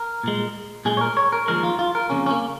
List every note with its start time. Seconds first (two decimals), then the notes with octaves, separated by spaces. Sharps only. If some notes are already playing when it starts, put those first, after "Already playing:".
Already playing: A#4
0.23 A#2 G#3
0.85 A#2 G#3 G#4
0.97 C#5
1.01 A#4
1.17 C#5
1.32 A#4
1.48 D#2 C#3 F3 G#3 A#4
1.63 F4
1.79 F4
1.95 A#4
2.10 F2 C#3 A#3 C#4
2.26 C#4
2.31 A#3